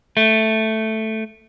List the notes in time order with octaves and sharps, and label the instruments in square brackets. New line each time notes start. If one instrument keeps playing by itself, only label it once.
[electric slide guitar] A3